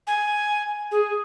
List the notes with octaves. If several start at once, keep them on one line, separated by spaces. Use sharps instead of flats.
G#5
G#4